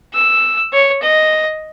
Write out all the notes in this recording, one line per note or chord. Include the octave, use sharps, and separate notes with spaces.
E6
C#5
D#5